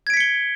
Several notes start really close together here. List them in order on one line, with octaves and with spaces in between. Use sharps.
G#6 D7 B6 C#7 G7